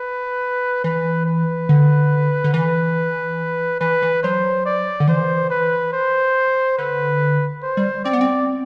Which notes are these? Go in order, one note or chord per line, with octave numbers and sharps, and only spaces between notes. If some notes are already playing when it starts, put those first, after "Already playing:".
Already playing: B4
E3 B4
B4
D3
D3
E3 B4
E3 B4
E3
F#3 C5
D5
D3
E3 C5
B4
C5
D3 B4
C5
G3
C4 D5
B3
C4